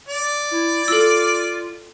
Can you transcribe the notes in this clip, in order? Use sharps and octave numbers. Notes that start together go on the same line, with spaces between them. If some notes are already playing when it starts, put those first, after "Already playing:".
D5
E4
F4 A4 E6